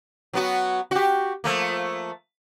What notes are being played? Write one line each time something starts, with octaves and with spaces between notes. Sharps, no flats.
F#3 B3 F#4
F#4 G4
F3 A3 A#3